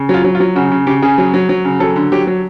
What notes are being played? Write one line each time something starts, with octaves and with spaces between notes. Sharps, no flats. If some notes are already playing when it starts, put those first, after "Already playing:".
Already playing: C#3
F#3 F4
F#3
F4
F#3
C#3 F#4
C#3
C#3 G4
C#3 G#4
F#3
F#3
F#3
C#3
F#3 A4
D3
F#3 G4
F#3